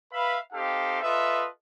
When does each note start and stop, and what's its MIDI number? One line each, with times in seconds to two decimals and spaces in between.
0.13 0.38 71
0.13 0.38 76
0.13 0.38 77
0.13 0.38 83
0.53 0.99 60
0.53 0.99 63
0.53 0.99 67
0.53 0.99 69
0.53 0.99 77
1.02 1.47 65
1.02 1.47 69
1.02 1.47 71
1.02 1.47 75
1.02 1.47 76